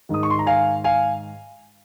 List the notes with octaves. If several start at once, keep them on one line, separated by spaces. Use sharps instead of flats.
G#2 D#3 D#6
C#6
C6
A#5
F5 G#5
F5 G#5